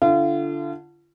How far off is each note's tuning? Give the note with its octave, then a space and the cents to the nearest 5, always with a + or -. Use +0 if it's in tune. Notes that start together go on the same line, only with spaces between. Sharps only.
D3 -5 F4 -40